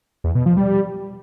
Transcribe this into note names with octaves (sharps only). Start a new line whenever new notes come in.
E2
B2
F3
G3